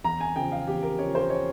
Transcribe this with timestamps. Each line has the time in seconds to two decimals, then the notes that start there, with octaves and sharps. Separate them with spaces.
0.04 E2 A#5
0.21 G#5
0.36 C#3 F3 G5
0.52 F5
0.67 E2 G4
0.83 A#4
0.99 C#3 F3 C#5
1.15 C5
1.30 C#5